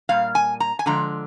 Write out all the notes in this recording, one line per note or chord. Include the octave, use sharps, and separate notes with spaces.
A#2 G3 F5
G#5
A#5
G#5
D3 F3 G#3 A#5